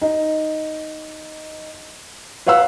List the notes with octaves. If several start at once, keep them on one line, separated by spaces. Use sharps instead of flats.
D#4
B4 C#5 F5 F#5 E6